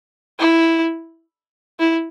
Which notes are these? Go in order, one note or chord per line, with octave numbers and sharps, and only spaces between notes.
E4
E4